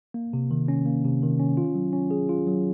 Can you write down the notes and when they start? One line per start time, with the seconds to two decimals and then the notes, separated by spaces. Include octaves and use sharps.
0.14 A#3
0.33 C3
0.51 D#3
0.68 C#4
0.86 A#3
1.05 C3
1.23 D#3
1.39 C#4
1.57 F4
1.75 F#3
1.93 C#4
2.11 G#4
2.29 F4
2.47 F#3